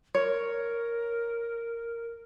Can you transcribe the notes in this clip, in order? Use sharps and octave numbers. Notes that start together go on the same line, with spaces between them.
A#4 C#5